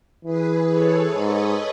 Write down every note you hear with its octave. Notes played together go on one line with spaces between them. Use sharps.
E3 G#4 B4
A4 C#5
G#2 B4 D#5